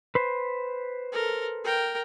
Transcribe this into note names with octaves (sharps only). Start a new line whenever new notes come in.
B4 C5
A4 A#4
A#4 G5